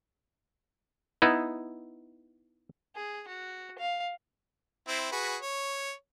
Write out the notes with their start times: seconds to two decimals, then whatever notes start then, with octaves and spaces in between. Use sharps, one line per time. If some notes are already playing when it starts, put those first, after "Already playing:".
1.22 B3 D#4 E4
2.96 G#4
3.28 F#4
3.79 F5
4.88 C4 E4
5.12 F#4 G#4 B4
5.42 C#5